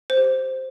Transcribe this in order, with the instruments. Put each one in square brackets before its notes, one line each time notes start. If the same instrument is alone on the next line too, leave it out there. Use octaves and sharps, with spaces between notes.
[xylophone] C5
G4
C5